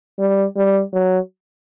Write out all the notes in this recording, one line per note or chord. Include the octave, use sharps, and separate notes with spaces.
G3
G3
F#3